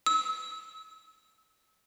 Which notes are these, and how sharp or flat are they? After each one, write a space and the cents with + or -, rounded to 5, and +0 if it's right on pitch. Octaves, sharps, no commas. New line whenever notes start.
E6 -35